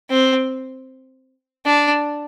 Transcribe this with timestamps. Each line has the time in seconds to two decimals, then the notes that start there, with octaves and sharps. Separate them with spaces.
0.10 C4
1.66 D4